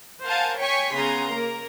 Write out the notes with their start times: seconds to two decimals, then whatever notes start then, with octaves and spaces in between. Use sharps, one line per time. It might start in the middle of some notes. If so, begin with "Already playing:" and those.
0.25 A#4 C5 F5 F#5 G#5 A5
0.60 C#5 G5 G#5 C#6 B6
0.94 C#3 B3 G#5 A#5 C6
1.29 A#3 A#4